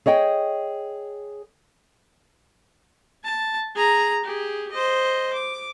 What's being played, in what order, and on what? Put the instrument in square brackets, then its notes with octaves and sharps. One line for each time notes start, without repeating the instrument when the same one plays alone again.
[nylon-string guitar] G#4 C#5 D#5 G5
[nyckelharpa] A5
G#4 A#5
G4 G#4
C5 D#5
D6